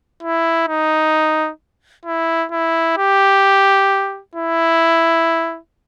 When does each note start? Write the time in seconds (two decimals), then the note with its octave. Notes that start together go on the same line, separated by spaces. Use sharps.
0.23 E4
0.68 D#4
2.05 E4
2.51 E4
2.97 G4
4.35 E4